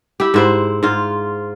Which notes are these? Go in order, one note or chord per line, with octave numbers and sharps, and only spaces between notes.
E4 G4
G#2 E4 C5
G#2 F4